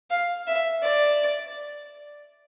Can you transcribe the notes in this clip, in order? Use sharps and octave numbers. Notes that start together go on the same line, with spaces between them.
F5
E5
D5